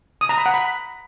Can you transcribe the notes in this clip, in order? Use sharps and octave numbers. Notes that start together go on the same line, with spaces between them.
D#6
A#5
B5
F#5
B5